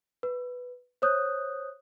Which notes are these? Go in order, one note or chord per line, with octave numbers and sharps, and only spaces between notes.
B4
C5 C#5 D#6 F#6 G6